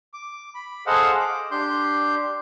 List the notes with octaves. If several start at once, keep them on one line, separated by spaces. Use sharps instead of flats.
D6
B5
G#4 A4 C5 D#5 F5 F#5
D6
D4 G4 C6 G6